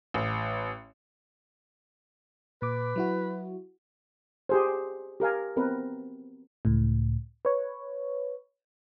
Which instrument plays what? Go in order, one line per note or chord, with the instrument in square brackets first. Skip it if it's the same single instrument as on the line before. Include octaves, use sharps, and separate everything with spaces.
[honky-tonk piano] A1
[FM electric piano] A#2 D6 [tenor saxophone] B4
[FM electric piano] F#3 E4 F#4
[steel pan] G4 G#4 C5
G4 A#4 F5 G#5
B3 C4 A#4 B4
[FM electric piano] C#2 A2
B4 C#5